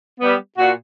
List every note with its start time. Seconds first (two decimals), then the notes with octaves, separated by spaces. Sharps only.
0.20 G3 B3
0.58 A#2 F#4